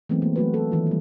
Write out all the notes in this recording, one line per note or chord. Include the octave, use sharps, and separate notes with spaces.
E3 F#3 G#3 A3 B3 C4
A#3
F#3 A3 F#4 B4
A4
D#3 E3 F4
G3 A#3